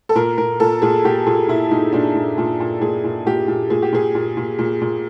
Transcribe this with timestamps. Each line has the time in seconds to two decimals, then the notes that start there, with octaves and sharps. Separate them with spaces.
0.09 A4
0.15 A#2 A#4
0.38 A#2 A#4
0.60 A#2 A4
0.82 A#2 G#4
1.04 A#2 G4
1.26 A#2 G#4
1.48 A#2 E4
1.71 A#2 D#4
1.93 A#2 D4
2.15 A#2
2.38 A#2
2.60 A#2
2.81 A#2 G#4
3.04 A#2
3.26 A#2 G4
3.48 A#2
3.70 A#2 G#4
3.82 G4
3.93 A#2 G#4
4.15 A#2
4.37 A#2
4.59 A#2
4.81 A#2